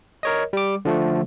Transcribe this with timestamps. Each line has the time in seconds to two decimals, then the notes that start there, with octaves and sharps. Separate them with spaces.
0.23 A#4 C#5 D#5
0.53 G3 D6
0.85 D3 F3 A3